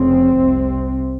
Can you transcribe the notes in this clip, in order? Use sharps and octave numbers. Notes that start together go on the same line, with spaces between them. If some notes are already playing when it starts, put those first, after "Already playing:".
Already playing: F1 F2 C#3 C4
C2 C3